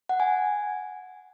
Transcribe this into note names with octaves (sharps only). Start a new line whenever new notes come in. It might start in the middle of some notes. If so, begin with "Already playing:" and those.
F#5
G#5